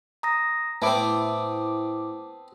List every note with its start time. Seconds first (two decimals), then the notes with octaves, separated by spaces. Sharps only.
0.23 A#5 D#6 A#6
0.82 A2 B3 C4 E4 A5 D6